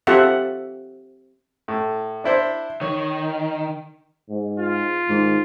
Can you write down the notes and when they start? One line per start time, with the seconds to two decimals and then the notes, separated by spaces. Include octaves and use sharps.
0.07 C4 F4 G4 A4 E5 F#5
1.68 A2
2.24 D4 E4 C5
2.81 D#3 C#5
4.30 G#2
4.60 F4
5.09 G#2 D#3